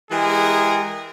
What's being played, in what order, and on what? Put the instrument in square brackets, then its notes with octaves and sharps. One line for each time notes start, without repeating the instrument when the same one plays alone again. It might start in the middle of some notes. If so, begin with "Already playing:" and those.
[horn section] E3 G#3 G4 G#4 A#4